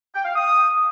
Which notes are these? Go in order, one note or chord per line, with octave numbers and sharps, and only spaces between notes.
G5
F5
D#6